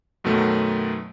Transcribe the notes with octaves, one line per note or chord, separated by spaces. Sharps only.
F#2 B2 D#3 F#3 A3